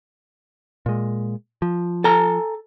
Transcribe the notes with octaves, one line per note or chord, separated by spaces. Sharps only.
A#2 G#3
F3
A4 G#5 A#5